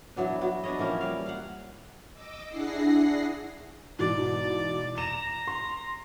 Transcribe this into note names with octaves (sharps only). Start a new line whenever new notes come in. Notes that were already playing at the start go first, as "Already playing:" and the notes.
E3 F#3 B3 D4
F#3 B3 F#4
D4 B4 C#5 D#5
E3 F3 A#3 C#4
G3 F5
F5 F#5
D#5 D6 E6
D4 E4 G#4 F#5 A#6 C7
G#2 B2 E3 D5
A#5 E7
C6